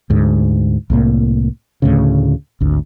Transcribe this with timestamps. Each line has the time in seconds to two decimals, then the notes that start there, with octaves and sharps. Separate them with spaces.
0.10 D2 G#2
0.90 C2 A2 A#3
1.82 D2 A2 C#3
2.60 G#1 D2